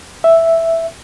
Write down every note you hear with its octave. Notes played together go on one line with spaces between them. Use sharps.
E5